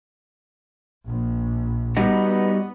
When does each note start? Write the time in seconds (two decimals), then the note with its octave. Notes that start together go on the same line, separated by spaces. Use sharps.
1.06 A#1
1.97 G3 B3 D#4 F#4